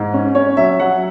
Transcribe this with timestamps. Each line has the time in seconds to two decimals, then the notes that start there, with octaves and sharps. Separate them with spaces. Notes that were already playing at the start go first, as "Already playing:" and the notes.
Already playing: G#2
0.14 C#4
0.35 C#4 C#5
0.57 F#3 E5
0.79 F#3 F#5